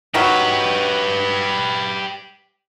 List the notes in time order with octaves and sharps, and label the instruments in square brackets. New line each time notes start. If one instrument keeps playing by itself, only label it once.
[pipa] D#3 F#3 F#4 [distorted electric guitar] G4 B4